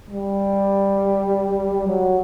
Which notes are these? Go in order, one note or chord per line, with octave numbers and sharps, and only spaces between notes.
G3
F#3